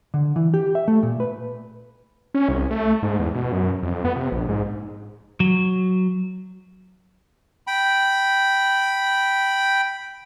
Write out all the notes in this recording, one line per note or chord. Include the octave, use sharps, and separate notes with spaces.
D3
E3
G4
E5
A3
A#2
B4
C#4
C2
A3
G#2
E2
B2
F#2
F2
B3
C3
A#1
G#2
F#3
G5 B5